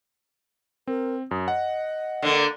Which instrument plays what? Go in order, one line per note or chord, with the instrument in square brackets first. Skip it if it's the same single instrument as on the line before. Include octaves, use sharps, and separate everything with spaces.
[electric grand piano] C4 [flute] A#4
[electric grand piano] F#2 [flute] D#6
[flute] D#5 [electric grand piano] F#5
[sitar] D3 A#3